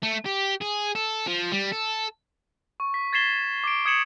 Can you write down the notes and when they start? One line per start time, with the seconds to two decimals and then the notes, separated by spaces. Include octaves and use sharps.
0.03 A3
0.26 G4
0.62 G#4
0.95 A4
1.27 F3
1.52 G3
1.72 A4
2.80 C#6
2.94 B6
3.13 G#6 A6 B6 C7 E7 G7
3.64 D6 D7
3.85 D#6 G#6 C#7 E7 F#7